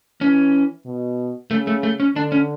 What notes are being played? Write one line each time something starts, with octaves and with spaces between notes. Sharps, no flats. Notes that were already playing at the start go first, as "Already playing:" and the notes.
E3 C#4
B2
C#3 A3
A3
A3
C#4
D3 D4
C#4